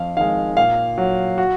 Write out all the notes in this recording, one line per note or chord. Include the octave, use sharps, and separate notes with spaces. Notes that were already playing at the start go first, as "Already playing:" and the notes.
Already playing: F2 F5
D#3 G#3 F5
A#2 F5
F#3
F#4